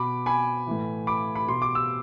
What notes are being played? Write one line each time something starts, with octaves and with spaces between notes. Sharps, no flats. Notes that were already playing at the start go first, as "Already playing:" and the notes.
Already playing: B2 B5 D6
G#5 B5
A2 E3
B5 D6
B5
B2 C6
D6
E6